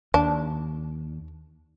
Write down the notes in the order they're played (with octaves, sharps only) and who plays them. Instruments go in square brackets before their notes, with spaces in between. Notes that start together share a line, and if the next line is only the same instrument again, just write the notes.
[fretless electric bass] D#2 [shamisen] D4